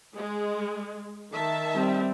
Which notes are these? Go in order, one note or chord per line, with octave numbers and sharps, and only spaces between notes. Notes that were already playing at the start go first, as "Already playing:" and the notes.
G#3
D#3 E5 A5
G3 C4